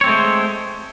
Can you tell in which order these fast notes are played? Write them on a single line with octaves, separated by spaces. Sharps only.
C#5 C4 A3 G#3 C5